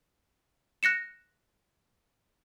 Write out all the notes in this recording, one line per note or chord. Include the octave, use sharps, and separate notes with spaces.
F#6 A#6 C#7 E7